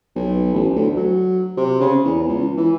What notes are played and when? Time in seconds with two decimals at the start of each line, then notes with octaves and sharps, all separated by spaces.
0.16 B1
0.54 A1
0.76 D2
0.96 F#3
1.57 C3
1.81 C#3
2.05 E2
2.28 C#2
2.57 E3